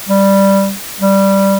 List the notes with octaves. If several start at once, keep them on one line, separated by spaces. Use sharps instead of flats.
G3
G3